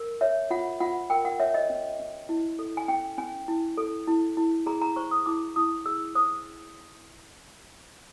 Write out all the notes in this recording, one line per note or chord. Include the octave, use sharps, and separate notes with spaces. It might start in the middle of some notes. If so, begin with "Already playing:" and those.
Already playing: A#4
C#5 E5
F4 F#5
F4 F#5
A#4 G5
F#5
C#5 E5
D#5
C#4
C#4
E4
A4
G#5
C#4 G5
C#4 G#5
E4
A4
E4
E4
G#4 A#5
A#5
C5 C#6
D#6
E4 D6
E4 D#6
G#4 E6
C5 D#6